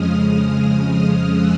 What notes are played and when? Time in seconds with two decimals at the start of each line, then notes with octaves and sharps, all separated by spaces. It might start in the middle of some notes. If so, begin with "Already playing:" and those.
Already playing: F2 C#3 F3 G#3 D#6 F6
1.25 E6 F#6